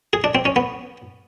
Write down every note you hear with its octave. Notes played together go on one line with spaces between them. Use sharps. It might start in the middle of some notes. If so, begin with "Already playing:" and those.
G#4
D4
C4
C#4
B3